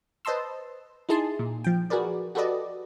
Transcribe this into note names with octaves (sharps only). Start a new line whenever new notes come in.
B4 C5 D#5 A5 C6 E6
D#4 E4 G#4 A5 C6
A#2
F3 G5
F#4 G#4 A#4 B4 D5
F#4 G4 A4 B4 D5 D#5